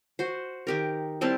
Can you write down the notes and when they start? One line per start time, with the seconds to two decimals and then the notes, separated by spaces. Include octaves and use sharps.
0.19 F#4 C5
0.67 D#3 G4 A#4
1.21 G3 C4 E4 A5